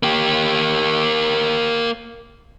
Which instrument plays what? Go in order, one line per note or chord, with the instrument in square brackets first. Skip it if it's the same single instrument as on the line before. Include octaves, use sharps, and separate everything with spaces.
[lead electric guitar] A#3 G4